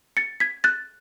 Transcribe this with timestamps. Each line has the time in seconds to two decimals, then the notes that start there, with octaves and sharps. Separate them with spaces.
0.17 A6 C#7
0.40 G#6 B6
0.64 F#6 A6